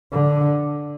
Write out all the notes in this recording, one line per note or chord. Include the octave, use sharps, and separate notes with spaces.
D3